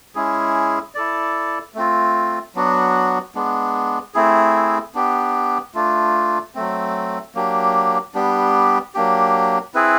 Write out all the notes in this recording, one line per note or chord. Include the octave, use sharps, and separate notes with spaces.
G#3 C#4 E4 G#4
E4 A4 D5
A3 C4 F4
F#3 B3 D4 F#4
G#3 B3 D4
A3 C4 E4 G#4
B3 D4 G4
A3 D4 F4
F#3 A3 C4
F#3 A#3 D4 G4
G3 B3 D4 G4
F#3 A#3 D4 G4
C4 E4 G#4 B4